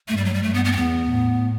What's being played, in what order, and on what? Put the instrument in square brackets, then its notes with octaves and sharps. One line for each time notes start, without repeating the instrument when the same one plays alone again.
[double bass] G2 [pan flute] A3
[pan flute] G3
F#3
G3
[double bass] G2 [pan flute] A3
[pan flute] B3
B3
C4
[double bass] E2 [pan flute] B3
[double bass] A2